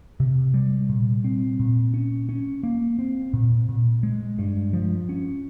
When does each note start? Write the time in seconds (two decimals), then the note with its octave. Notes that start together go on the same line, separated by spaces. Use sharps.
0.20 C3
0.54 G3
0.89 A#2
1.24 C4
1.60 A#2
1.94 C#4
2.29 C#4
2.63 A#3
2.99 C4
3.33 A#2
3.69 A#2
4.03 G#3
4.39 G2
4.73 F3
5.09 C#4